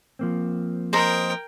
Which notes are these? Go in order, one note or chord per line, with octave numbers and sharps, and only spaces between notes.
F3 A#3 C4
A#4 C5 D#5 G5 A#5